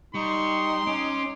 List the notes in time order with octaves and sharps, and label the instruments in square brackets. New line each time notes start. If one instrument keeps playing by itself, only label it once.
[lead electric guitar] G3 [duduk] D#4 [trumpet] C6 [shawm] C#6
[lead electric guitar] C#4 [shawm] D6